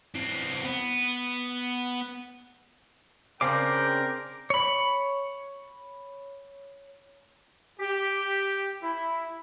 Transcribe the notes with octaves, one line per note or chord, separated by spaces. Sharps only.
E3 C4
B3
C#3 C4 D4 A#4 G5 D6
C#5 B5
G4
E4